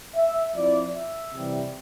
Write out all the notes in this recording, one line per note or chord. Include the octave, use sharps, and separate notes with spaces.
E5
F3 C4 E4 D5
E5
C3 E3 G3